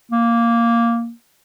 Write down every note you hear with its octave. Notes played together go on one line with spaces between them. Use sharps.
A#3